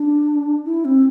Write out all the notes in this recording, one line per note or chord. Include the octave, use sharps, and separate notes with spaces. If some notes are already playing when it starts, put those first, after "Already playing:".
Already playing: D4
E4
C4